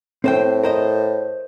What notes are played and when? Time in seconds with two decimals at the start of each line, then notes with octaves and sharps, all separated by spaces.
0.24 A2 C4 C5 G5
0.63 A#4 C5 D#5